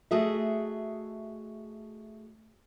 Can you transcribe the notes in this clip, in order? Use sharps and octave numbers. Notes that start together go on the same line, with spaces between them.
A3 F#4 G#4 D#5 E5